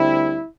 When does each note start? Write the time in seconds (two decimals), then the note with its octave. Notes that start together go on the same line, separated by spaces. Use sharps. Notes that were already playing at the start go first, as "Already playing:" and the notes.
Already playing: D2 D3 G3 C4 E4